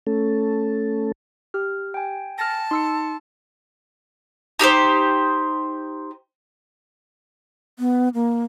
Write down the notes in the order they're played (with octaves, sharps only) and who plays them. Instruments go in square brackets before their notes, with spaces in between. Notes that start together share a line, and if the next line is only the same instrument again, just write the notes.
[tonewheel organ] A3 C#4 A4
[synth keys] G4 [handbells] F6
[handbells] G5 G#5
[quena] A5 [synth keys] F6 A6 A#6
[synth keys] D#4 E6 C#7 [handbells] C6
[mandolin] D#4 G4 A4 C5
[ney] B3
A#3